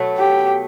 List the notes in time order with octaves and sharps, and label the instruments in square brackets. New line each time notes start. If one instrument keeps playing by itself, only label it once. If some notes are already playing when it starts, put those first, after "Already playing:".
Already playing: [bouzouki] B2 F#3 A3
[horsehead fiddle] G4